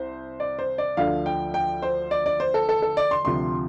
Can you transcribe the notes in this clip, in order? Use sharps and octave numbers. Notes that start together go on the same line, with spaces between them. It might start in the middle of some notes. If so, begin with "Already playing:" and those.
Already playing: C2 C5
D5
C5
D5
D2 D3 F3 F5
G5
G5
C5
D5
D5
C5
A4
A4
A4
D5
C6
D2 C3 F3 C6